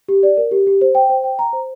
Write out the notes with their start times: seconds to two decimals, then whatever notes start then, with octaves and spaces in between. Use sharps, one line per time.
0.08 G4
0.23 D5
0.37 A#4
0.51 G4
0.67 G4
0.81 C5
0.95 G5
1.10 C5
1.24 G5
1.39 A#5
1.53 C5